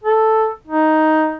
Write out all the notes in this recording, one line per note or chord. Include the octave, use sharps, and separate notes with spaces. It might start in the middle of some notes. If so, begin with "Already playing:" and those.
A4
D#4